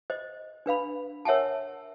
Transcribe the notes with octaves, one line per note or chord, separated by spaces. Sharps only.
C5 D#5
D4 B4 F5 B5
A#4 C#5 E5 F#5 G#5 A5